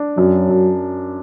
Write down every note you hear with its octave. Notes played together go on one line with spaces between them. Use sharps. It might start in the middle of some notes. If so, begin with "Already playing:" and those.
Already playing: D4
F#2 F#3
F#2